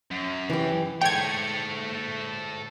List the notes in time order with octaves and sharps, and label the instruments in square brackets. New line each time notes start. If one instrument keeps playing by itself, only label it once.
[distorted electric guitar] F#2
[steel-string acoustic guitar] E3 G4
[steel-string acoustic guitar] D2 G#2 [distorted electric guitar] A4 C#5 [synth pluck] G5 G#6